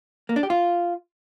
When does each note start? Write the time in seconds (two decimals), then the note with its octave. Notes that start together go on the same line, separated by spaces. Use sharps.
0.29 A#3
0.36 D4
0.43 G4
0.50 F4